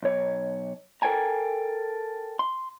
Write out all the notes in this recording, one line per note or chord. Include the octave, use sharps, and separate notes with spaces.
B1 C#5
A4 A#4 C5 G5 G#5 A#5
C6